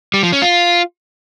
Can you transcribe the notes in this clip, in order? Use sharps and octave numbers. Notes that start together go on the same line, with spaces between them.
G3
F3
C#4
F4